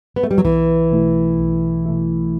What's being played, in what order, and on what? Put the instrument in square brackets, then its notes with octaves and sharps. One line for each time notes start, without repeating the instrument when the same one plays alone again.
[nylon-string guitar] B3
A3
G3
F#3
[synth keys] B1 [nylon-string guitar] E3
[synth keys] B2 A3 E4
B1
B2 A3 E4